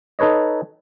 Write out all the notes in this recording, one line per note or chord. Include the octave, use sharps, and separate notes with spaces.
D#4 A4 B4 C#5 D#5